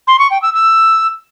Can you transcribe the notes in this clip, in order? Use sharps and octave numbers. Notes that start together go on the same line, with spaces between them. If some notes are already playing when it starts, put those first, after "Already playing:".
C6
C#6
G5
E6
E6